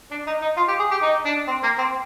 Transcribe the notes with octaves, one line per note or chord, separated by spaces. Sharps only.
D4
D#4
D#4
F4
G4
G#4
G4
D#4
D4
C4
A#3
C4